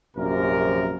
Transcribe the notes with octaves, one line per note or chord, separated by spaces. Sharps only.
A#1 F#2 C3 A#4